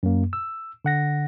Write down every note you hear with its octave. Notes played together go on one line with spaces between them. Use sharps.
F#2 A#3
E6
D3 F#5 A#6